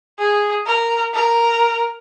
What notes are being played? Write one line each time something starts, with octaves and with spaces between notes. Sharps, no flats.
G#4
A#4
A#4